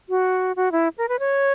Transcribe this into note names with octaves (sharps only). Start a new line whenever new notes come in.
F#4
F#4
E4
A#4
B4
C#5